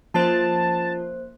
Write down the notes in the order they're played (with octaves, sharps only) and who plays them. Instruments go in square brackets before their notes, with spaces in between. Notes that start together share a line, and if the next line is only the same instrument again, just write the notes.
[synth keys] F3 C#4 F4 [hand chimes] A#3 C5 [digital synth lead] A5